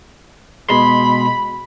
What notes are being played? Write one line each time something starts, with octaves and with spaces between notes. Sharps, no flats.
B2 G#3 B5 C6